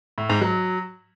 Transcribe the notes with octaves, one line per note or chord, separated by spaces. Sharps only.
A2
G#2
F#3